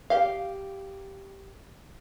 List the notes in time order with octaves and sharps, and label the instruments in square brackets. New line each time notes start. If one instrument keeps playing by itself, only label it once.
[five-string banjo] G4 F5